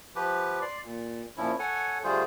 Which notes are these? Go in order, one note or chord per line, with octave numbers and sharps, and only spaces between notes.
F3 G4 B4
D5 C6
A#2
A#2 F3 C#4 E4
A4 C#5 F#5 G#5
D3 G3 A3 F4 G#4 C5